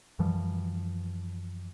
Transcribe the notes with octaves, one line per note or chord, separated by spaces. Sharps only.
F#2 E3 F3 G3